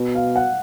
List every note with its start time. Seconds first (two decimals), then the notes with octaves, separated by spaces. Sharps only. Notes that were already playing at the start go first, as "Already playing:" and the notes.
Already playing: B2
0.15 F5
0.36 F#5